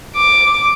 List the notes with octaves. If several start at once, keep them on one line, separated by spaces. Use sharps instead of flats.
D6